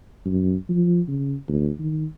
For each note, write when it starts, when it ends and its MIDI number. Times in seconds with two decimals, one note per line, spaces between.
0.25 0.54 42
0.69 1.00 53
1.08 1.36 49
1.48 1.70 38
1.79 2.05 51